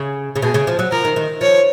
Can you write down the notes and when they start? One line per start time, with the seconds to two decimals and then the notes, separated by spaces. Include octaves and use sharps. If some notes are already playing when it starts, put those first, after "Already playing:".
Already playing: C#3
0.36 C#3
0.42 B2 G#4
0.54 C#3
0.67 F3
0.79 F#3
0.91 F3 A#4
1.05 D#3
1.16 D#3
1.41 F3 C#5